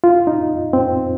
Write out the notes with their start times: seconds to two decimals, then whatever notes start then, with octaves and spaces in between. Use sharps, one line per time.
0.04 F4
0.27 D#4
0.73 C4